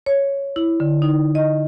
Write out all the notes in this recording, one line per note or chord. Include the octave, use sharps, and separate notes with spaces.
C#5
E4
D3
D#4
D#5